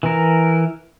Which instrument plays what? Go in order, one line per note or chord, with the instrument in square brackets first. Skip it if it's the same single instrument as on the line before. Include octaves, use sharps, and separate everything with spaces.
[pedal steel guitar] E3 A#4